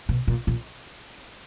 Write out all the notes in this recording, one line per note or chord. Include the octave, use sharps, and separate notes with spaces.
B2
A#2
A#2